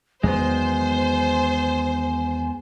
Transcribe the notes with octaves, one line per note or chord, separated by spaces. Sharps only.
E2 D#3 F#3 G#3 B3 C5 G#5